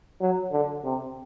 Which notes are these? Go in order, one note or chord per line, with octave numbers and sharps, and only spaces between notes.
F#3
D3
C3